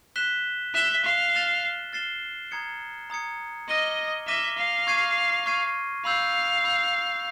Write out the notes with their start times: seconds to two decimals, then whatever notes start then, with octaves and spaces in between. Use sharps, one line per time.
0.16 F#6 B6 E7 G7
0.75 E5 F#6 B6 E7 G7
1.04 F5
1.33 F6 A6 C7 E7 G7
1.93 F6 A6 C7 E7 G7
2.51 A#5 D#6 G#6 C#7
3.10 A#5 D#6 G#6 C#7
3.69 D#5 D6 F6 A#6 D#7 G7
4.28 E5 D6 F6 A#6 D#7 G7
4.58 F5
4.87 C#6 F6 G#6 C7 D#7
5.46 C#6 F6 G#6 C7 D#7
6.05 F5 B5 E6 G6
6.64 B5 E6 G6